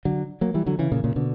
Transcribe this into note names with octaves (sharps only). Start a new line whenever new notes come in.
D3 F#3
F#3 A#3
E3 G3
D3 F#3
C#3 E3
A#2 C#3
A#2 C#3
B2 D3